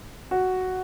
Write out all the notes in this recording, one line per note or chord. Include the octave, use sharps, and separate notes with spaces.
F#4